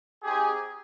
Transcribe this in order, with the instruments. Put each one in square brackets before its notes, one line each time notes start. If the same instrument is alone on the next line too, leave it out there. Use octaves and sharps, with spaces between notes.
[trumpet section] C4 D#4 G4 G#4